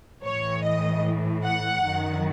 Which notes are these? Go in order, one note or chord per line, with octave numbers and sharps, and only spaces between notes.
A2 E3 C#5
D#5
F#5
F#2 D#3